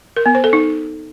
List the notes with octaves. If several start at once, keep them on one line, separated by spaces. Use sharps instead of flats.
A#4
B3
C5
A4
D#4